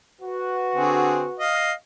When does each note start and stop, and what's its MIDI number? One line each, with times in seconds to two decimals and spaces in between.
0.22 1.43 66
0.22 1.43 71
0.76 1.25 50
0.76 1.25 60
0.76 1.25 68
1.39 1.72 75
1.39 1.72 77